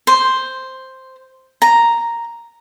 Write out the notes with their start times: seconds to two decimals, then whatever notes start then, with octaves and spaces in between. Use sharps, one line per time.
0.07 C5
1.62 A#5